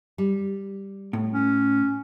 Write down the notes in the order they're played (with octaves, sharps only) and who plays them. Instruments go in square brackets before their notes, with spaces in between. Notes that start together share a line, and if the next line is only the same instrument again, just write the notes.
[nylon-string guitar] G3
[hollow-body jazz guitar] A2
[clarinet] C#4